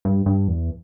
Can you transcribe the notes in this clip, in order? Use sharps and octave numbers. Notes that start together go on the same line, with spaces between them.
G2
G2
E2